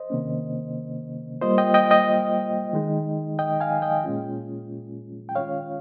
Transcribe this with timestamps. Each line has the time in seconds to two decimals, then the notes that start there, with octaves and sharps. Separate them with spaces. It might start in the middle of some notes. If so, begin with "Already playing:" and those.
Already playing: C5 D#5
0.10 C3 D#3 A#3 C#4
1.41 G3 A#3 F4 C5 D#5
1.58 D#5 G5
1.74 D#5 G5
1.91 D#5 G5
2.73 D#3 G#3 D#4
3.39 D#5 G5
3.60 F5 G#5
3.82 D#5 G5
4.04 A#2 G#3 C#4 F4
5.29 G5
5.35 D#3 G#3 C#4 F4 C#5 F5